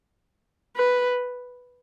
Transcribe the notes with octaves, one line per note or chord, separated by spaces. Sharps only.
B4